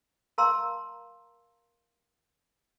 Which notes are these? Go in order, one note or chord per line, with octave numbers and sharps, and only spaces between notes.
A#4 F5 A5 A#5 C6 E6